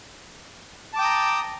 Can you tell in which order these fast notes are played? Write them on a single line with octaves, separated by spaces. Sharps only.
A5 D6 G5 D#6 A#5